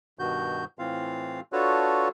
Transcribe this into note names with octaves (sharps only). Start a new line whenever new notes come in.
G2 B2 D#3 F#4 G6
A2 E3 C4 F4 F5
D4 F4 F#4 A4 B4 C#5